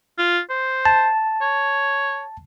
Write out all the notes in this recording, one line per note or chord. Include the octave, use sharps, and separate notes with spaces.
F4
C5
A5
C#5